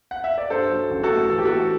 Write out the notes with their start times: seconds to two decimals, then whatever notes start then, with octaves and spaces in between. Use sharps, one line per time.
0.11 F#5
0.24 E5
0.38 D5
0.50 G2 A4 C5
0.70 F#3
0.91 A1
1.03 F#4 A4
1.11 A3
1.30 E3 A4
1.38 G4
1.45 A3 F#4 A4